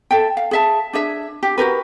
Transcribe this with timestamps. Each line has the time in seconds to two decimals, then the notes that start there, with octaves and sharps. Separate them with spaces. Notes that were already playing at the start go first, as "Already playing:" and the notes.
0.11 A4 E5 G5
0.37 F5
0.51 G#4 E5 A5
0.93 D4 G#4 E5
1.43 G4
1.58 F#4 G4 A#4 B4